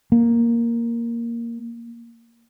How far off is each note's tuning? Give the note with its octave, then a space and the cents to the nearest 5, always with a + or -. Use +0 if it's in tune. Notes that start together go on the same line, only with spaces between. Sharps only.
A#3 +0